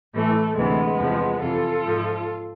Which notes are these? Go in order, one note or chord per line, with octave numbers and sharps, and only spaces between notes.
A2 E3 A3
D2 C3 E3 G#3 B3
E2 C3 F3
F2 C3 E3 F4 A4
G#2 F3